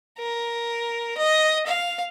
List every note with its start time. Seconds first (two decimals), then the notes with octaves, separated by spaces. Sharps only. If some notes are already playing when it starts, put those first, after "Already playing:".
0.18 A#4
1.17 D#5
1.67 F5